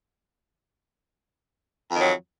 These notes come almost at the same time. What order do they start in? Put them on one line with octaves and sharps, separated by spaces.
F2 D#3 F#3